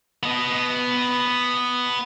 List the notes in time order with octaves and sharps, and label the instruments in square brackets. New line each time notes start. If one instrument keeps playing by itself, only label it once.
[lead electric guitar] B3 D#5